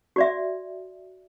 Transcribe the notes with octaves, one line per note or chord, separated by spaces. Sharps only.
F#4 D5 E5